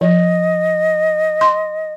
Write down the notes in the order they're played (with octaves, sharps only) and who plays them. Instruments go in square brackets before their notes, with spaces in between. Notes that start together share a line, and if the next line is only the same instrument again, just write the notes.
[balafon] F3 [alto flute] D#5
[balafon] C6